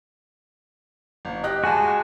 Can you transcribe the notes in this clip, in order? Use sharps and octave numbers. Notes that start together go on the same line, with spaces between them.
F#1
G4 D#5 F#6
G#3 F#4 G#5 A5